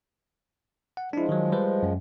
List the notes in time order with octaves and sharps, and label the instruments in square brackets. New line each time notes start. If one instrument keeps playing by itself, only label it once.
[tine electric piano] F#5
[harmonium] F3 G#3 [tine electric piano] D4 E4
[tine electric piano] D#3 F#3
G3 B4 C5
F#2